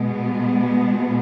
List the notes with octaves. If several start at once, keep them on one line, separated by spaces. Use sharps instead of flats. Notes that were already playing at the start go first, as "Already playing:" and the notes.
Already playing: B2 G#3 B3